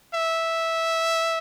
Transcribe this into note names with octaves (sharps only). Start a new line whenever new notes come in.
E5